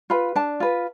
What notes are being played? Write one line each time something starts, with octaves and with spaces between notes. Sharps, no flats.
F4 B4 B5
D4 A5
F4 B4